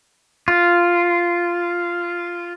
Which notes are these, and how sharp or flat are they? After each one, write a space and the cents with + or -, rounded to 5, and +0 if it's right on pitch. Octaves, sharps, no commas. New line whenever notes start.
F4 -5